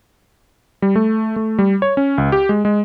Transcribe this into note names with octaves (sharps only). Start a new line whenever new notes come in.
G3
A3
A3
G3
C#5
C#4
C#2
G4
G#3
G#3